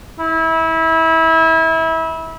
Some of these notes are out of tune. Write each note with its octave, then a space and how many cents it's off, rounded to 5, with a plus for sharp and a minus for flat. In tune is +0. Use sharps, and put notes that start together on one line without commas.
E4 -25